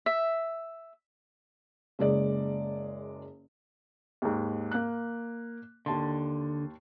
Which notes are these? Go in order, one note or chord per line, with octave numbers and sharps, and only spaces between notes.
E5
F#1 G#3 D5
D#2 G#2
A#3 F#6
D#2 D3 A5 C6